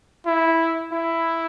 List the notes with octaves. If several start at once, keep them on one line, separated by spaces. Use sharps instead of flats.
E4
E4